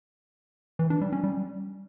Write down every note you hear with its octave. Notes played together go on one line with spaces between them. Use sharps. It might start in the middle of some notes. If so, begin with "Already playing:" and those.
E3
D4
G3
C#4
G3